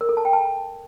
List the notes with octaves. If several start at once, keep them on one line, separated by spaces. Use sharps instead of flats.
A#4
A4
A5
G5
A5